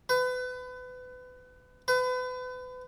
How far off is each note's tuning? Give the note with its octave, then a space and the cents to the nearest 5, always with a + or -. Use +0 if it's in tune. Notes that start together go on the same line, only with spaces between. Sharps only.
B4 +30
B4 +35